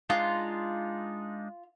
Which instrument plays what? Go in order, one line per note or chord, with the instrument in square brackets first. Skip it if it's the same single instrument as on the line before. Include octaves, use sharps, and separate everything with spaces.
[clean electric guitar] G#3 D4 D#4 [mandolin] F4